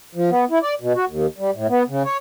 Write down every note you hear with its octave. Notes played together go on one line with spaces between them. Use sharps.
F3
B3
E4
D5
B2
F#4
D#2
G3
A2
B3
C#3
C#5